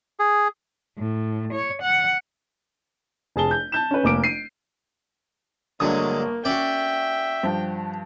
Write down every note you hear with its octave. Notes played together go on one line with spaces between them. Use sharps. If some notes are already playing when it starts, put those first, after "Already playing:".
G#4
A2
C#5
F#5
F1 G#4 A5 G7
G6
A5 G6 E7
C#4 B4
F1 A#3 D6 D7
C7 D#7
G1 D3 F#3 G#3 A#3 D4 D#6
C#4 F#4 D5 E5 G5
G2 F3